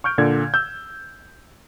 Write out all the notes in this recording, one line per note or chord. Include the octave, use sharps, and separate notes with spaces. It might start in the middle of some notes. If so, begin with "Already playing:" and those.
C#6 F6 G6 D7
A#2 D3 G#6
E6 G6